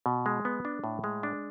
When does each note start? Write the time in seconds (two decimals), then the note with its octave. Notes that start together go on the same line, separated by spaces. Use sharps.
0.06 B2
0.26 G#3
0.45 B3
0.65 D4
0.84 A2
1.04 G#3
1.23 D4